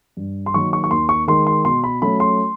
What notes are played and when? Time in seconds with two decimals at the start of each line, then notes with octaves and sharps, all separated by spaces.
0.17 G2
0.46 C6
0.54 D#3 F#3 A#3 D#4 C#6
0.73 C#6
0.84 C#6
0.91 D#2 C6
1.09 C#6
1.28 D#3 G#3 C6
1.47 C6
1.65 B2 C6
1.84 B5
2.02 F#3 A3 C#4 B5
2.20 C6